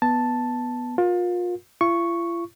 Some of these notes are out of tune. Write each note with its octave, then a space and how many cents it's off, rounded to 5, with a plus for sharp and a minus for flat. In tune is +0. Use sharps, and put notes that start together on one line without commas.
B3 +0 A5 +0
F4 +30 A#4 +30
F4 -45 C#6 +0